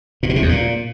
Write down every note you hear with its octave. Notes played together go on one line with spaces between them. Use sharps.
A#2
B2
C3
E2
A#2